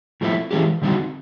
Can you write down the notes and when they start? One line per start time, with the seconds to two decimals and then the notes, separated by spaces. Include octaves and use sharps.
0.21 A2 F3 A3 C4 E4
0.51 E3 G#3 C#4 E4 G4
0.82 D3 G3 C4 D#4 F#4